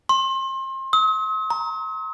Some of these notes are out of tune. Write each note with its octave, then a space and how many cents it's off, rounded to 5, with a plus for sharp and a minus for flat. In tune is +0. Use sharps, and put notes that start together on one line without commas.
C6 +35
D#6 +45
A#5 +5